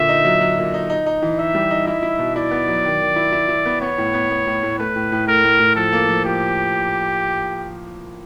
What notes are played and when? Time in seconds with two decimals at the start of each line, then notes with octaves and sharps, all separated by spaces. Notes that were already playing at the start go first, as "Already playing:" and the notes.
Already playing: A#2 D3 E5
0.09 D#4
0.25 F#3
0.41 F#3
0.57 A#2
0.74 D#4
0.90 D#4
1.06 D#4
1.22 E3
1.39 D#4 E5
1.55 G3
1.71 D#4
1.87 E4 E5
2.03 E4
2.19 B2
2.36 E4 D5
2.51 B3
2.68 F#3
2.85 D#3
3.01 D#3
3.16 E4
3.32 E4
3.49 E4
3.66 B3
3.81 B3 C#5
3.98 A2
4.14 B3
4.30 B3
4.47 A2
4.63 A2
4.79 A3 B4
4.96 A2
5.12 A2
5.27 A3 A#4
5.44 A2
5.59 A2
5.76 F3 A4
5.93 A#3
6.09 F3
6.25 F3 G4